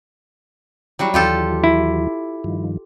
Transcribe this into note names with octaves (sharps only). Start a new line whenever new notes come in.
F#3 G3 E4 F#4 G4
D#2 E3 F#3 F4 G4 A4
E4
G2 D#3 F3